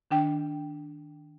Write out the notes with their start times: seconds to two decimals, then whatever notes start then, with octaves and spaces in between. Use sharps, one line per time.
0.11 D#3 D4 G5